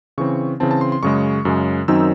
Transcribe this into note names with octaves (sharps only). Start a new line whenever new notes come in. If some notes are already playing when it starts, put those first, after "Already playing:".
C#3 E3 C4 C#6
C#3 E3 C4 A5
A5
C6
C6
F#2 C#3 G#3 C#6
F#2 C#3 G#3
F#2 D#3 F#3 C4 D#4 E6